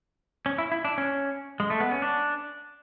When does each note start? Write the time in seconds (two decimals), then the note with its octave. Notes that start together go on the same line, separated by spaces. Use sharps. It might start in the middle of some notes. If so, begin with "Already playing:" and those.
0.46 C#4
0.58 E4
0.72 E4
0.85 D4
0.98 C#4
1.60 G#3
1.70 A3
1.80 B3
1.91 C#4
2.02 D4